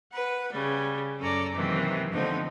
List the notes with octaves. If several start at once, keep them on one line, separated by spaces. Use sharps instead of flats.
B4 F#5
C#3 G3
F#2 C#4 A4 D5 A#5
C3 D#3 E3 F#3 A#3
D3 F3 A3 B3 C4 D#4